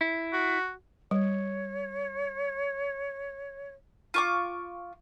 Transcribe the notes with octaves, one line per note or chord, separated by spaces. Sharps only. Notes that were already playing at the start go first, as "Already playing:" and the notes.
E4
F#4
G3 C#5
F4 C#6 D6